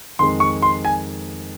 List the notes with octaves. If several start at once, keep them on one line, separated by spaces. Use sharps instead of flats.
F2 D#3 G#3 C6
C#6
C6
G#5